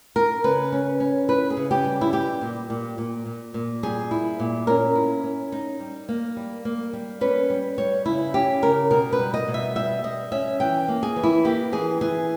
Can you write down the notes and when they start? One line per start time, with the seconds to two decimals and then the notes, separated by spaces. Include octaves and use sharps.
0.15 D#4 A#4
0.44 C#3 B4
0.72 C#4
1.00 C#4
1.28 E4 B4
1.50 G#4
1.57 C#3
1.71 G4
1.85 G3
2.01 E4
2.13 G3 G4
2.41 A#2
2.70 A#2
2.98 A#2
3.26 A#2
3.54 A#2
3.83 G3 G#4
4.11 E4
4.40 A#2
4.67 C#4 A#4
4.95 E4
5.24 C#4
5.52 D#4
5.80 G3
6.09 A#3
6.37 G3
6.65 A#3
6.93 G3
7.21 C#4 B4
7.50 G3
7.78 G3 C#5
8.06 C#3 E4
8.34 C#4 G4
8.62 C#3 A#4
8.90 B2 A#4
9.13 B4
9.19 G3
9.34 D#5
9.48 B2
9.54 E5
9.75 G3 E5
10.04 G3 D#5
10.32 C#4 E5
10.60 E3 G5
10.88 A#3
11.03 G#4
11.16 E3
11.23 E4
11.45 A#3 G4
11.72 E3 G#4
12.01 E3 G#4